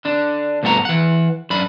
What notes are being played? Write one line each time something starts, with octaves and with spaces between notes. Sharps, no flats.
D3 D4
D2 G2 B2 A4 F#5 A#5
E3 F#5
F#2 D4 B5